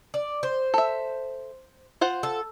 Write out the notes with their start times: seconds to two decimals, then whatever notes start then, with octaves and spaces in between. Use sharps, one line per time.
0.14 D5
0.43 C5
0.74 A4 E5
2.01 F4 C5 F#5
2.23 A4